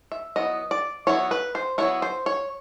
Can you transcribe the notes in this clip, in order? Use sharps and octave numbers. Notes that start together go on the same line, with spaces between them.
E5
F#3 B3 E4 D#5
D5
F#3 B3 E4 C#5
B4
C5
F#3 B3 E4 C#5
C5
C#5